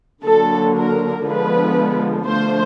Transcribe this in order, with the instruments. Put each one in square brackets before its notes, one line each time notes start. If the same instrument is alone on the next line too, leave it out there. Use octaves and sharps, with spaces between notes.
[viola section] D3 F#3 A#3 A4
A#4
D3 F3 G#3 B3 B4
D3 F3 A3 C5